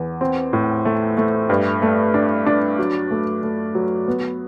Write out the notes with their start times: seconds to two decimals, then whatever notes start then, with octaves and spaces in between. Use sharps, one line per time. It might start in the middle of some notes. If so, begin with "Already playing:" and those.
Already playing: E2
0.21 C4
0.53 A2
0.85 A3
1.17 A3
1.50 G2
1.82 A3
2.14 D4
2.46 D4
2.78 F#3
3.11 A3
3.43 A3
3.75 F#3
4.07 B3